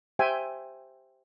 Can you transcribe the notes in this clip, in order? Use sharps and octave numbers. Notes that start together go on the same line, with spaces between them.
G4 C5 E5 G5 G#5